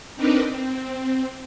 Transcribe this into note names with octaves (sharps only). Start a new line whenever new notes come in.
C4 D4 D#4 A#4 B4 D5
C4